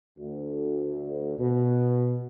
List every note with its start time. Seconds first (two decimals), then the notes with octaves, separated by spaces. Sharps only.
0.19 D2
1.39 B2